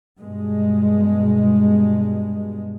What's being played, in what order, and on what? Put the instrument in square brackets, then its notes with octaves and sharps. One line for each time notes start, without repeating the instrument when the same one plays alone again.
[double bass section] G2 B2 G#3